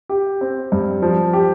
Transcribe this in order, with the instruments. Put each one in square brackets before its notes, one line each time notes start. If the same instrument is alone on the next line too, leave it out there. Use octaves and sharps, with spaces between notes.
[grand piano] G4
C4
G2
F3
G4